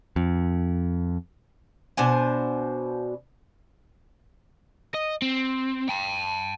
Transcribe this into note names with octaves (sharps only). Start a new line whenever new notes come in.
F2
B2 D4 C5 G#5
D#5
C4
G5 A5